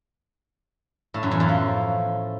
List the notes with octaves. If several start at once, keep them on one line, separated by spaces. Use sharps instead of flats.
A2
F#2
E2
F#2
F3